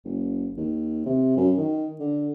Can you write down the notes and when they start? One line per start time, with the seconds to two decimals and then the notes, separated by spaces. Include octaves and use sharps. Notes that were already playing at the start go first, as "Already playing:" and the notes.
0.04 F#1
0.57 D#2
1.06 C3
1.37 F#2
1.57 D#3
2.00 D3